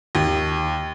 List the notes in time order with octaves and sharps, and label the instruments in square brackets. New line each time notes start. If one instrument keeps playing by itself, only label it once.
[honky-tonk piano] D#2